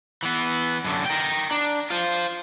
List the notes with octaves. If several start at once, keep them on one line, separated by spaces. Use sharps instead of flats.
E3 B3
F#2 D3
A#4 G5
D4
F4 C5